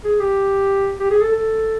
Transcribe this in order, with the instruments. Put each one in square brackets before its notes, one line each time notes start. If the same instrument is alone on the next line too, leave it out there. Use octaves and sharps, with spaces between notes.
[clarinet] G#4
G4
G4
G#4
A4
A4